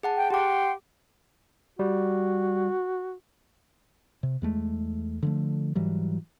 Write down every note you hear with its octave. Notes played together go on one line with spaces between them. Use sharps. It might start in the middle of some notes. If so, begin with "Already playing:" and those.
G#4 F#5 A5
G5
G4 F#5 G5 C6 D6
G3 F#4
C3
E2 G#3 A3
D3 F3 A3
G#2 E3 F#3 G3